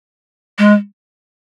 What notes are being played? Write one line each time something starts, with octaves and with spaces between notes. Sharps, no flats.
G#3